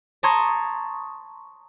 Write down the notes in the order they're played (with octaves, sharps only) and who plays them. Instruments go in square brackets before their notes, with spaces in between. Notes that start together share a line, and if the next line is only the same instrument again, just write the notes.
[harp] A5 A#5 C6 C#6 D#6 G#6